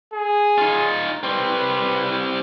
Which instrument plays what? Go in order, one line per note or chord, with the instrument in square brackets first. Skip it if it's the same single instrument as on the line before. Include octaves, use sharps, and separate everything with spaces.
[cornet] G#4
[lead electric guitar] D#4 F4
[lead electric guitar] G3 C4 [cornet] B4